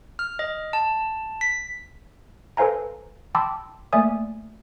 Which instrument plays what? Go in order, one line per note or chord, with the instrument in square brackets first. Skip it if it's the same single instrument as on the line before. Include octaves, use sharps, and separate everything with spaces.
[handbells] F6
D#5
A5
B6
A4 B4 C5 F5 G#5 A#5
G5 A5 B5 C6 D6 E6
A3 A#3 D5 E5 G#5 D#6